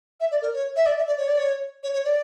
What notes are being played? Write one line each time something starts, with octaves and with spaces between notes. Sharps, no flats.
E5
D5
A#4
C#5
E5
D5
E5
D5
C#5
D5
C#5
C#5
C#5
D5